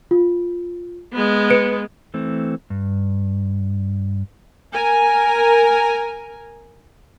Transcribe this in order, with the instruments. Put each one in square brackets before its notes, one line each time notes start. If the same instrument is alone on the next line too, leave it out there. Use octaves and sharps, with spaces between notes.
[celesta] F4
[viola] G#3 B3
[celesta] B4 C#7 D7
[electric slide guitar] E3 A3 C4
G2
[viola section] A#4 G#5